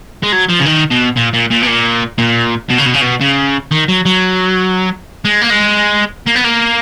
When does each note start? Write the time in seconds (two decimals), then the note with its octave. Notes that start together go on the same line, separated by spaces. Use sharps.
0.23 G#3
0.32 F#3
0.49 F3
0.59 C#3
0.65 D#3
0.91 B2
1.17 A#2
1.34 A#2
1.51 A#2
1.62 B2
1.67 A#2
2.18 A#2
2.69 B2
2.78 C#3
2.86 B2
2.94 C#3
3.01 B2
3.21 C#3
3.71 D#3
3.88 F#3
4.06 F#3
5.25 G#3
5.42 A#3
5.50 G#3
6.27 A#3
6.36 B3
6.45 A#3